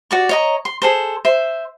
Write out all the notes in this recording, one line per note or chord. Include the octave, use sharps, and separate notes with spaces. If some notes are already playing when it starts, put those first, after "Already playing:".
F#4 D5 C#6
C#5 D#5 A#5
C6
G#4 A4 C5
C5 E5